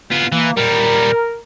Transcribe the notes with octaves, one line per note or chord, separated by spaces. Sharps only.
B3 F4
E3 A#3
A#2 G3 A#4